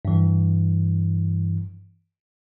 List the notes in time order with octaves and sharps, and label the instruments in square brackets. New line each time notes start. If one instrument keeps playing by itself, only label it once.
[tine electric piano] G2 E3